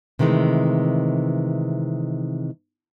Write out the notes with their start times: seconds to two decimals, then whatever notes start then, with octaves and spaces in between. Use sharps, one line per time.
0.19 C3 D#3 E3 G#3 A3